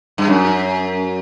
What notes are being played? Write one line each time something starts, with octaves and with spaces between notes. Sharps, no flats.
G2
F#2